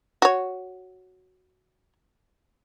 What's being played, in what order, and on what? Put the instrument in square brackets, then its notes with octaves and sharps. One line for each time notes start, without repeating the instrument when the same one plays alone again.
[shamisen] F#4 C#5